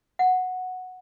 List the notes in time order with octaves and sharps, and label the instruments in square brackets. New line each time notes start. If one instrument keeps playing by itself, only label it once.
[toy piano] F#5